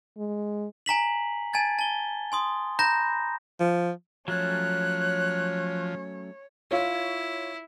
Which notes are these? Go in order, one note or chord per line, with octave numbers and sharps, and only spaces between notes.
G#3
G#5 A#5 B6 F#7
G#5 A5 G#6 A6
A5 G7
G#5 C6 D#6
A#5 B5 G6 A#6
F3
F3 F#3 A3 C#4 C#5 F#6
E4 F4 C#5